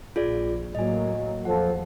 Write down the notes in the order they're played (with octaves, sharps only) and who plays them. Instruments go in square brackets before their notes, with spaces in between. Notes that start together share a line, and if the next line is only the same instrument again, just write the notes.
[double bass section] A#1 [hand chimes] F4 G#4 D5
[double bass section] A2 F#3 A#3 [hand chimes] D#5 G#5
[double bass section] E2 [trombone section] F3 A4 [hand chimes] F#5